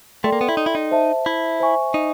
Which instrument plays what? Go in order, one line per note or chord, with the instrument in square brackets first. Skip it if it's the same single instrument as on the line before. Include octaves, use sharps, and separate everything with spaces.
[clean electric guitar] A3 [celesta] A4 D5 G5 C6
[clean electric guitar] A#3
B3
E4
D#4
E4
D#4
[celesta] C5 E5 A5
[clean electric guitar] E4
[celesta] C5 E5 G#5 C#6
[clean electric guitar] D#4